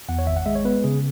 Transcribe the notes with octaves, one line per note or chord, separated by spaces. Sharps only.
E2 F#5
C#5
G#1 E5
F#5
G#3 E5
C#5
B3 B4
C#3 G#4